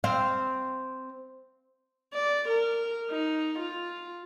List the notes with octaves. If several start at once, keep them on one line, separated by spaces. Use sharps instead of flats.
C4 F5
D5
A#4
D#4
F4